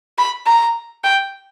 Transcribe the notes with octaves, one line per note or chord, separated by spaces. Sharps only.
B5
A#5
G5